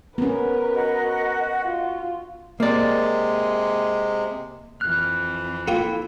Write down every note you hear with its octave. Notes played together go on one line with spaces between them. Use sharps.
B3 C#4 A#4 B4
F#4 D#5 F#5
F4
C3 G#3 A#3 D5
F2 E3 F6 F#6
A#3 E4 F4 A4 G5